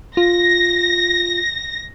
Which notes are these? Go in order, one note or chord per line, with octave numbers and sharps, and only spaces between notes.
F4 A#6